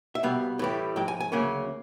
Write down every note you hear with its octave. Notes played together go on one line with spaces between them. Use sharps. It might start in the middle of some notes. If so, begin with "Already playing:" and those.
E5
C2 B2 G3 B3 F5
A2 E3 G3
G#2 F3 G5
G#5
G#5
D2 C#3 F#3 A#3 C#4